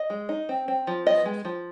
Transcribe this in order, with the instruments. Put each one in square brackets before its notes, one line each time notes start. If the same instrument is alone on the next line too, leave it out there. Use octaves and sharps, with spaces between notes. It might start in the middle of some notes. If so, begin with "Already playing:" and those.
Already playing: [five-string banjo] D#5
G#3
D#4
C4
C4
F3
B3 D#5
G#3
F3